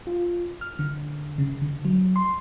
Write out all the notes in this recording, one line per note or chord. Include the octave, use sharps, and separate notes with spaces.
F4
F6
D3
C#3
D3
F#3
C6